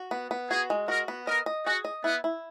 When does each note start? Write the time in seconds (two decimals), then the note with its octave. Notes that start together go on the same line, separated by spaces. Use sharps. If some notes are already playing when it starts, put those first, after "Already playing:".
Already playing: F#4
0.11 B3
0.31 B3
0.50 F#4 G#4
0.70 G#3
0.88 F#4 A#4
1.08 B3
1.27 A#4 D#5
1.46 D#5
1.66 F#4 G#4
1.85 D#5
2.04 B3 E4
2.24 E4